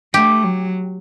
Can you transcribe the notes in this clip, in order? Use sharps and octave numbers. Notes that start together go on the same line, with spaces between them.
A3 G4
F#3